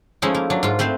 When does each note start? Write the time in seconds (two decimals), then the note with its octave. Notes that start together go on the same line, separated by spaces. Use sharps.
0.22 F3 G#3 A3 C#4 D#4 E4
0.35 A#3
0.50 F#3 D4
0.63 G#2 F4
0.79 A3 C4 B4 C5 F5